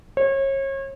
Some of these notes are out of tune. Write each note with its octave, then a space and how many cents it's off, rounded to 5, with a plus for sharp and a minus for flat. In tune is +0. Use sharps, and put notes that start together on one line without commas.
C#5 -35